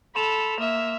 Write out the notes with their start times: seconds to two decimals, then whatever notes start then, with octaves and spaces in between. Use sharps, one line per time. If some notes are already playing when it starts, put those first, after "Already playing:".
0.16 A4 B5 C6 E7 F7
0.60 A#3 E5